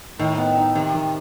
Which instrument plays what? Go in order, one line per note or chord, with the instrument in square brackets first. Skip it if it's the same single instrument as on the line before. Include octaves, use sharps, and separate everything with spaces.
[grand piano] A2 [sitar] D#3
[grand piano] B3
D#4
[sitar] C3 [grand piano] D#3
[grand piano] D#3